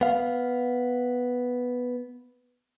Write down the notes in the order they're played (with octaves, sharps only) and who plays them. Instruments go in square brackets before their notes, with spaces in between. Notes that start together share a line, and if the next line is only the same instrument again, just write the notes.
[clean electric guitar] B3 F5